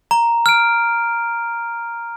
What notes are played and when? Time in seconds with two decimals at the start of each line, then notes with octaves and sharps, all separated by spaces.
0.11 A#5
0.46 F6 D7